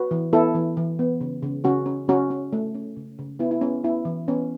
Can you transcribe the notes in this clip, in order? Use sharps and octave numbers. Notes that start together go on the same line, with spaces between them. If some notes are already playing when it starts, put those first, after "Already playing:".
Already playing: F#4 B4
E3
B3 E4 A4
E3
E3
B3
C#3
C#3
C#3 C#4 F#4
C#4
C#3 C#4 F#4
C#4
A3
C#4
C#3
C#3
B3 E4
E4
B3 C#4
B3 E4
E3
B3 C#4